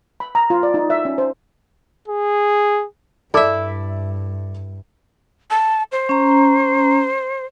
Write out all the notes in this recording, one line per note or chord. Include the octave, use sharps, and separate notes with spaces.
B5
A#5
F4
D5
D#4
E5
C#4
C5
G#4
G2 E4 A4 D5 E5 D6
A5
C5
C#4 A#5